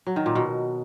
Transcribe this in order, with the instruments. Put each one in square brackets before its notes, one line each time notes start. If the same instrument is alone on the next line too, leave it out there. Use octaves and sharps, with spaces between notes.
[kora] F#3
D#3
A#2
B2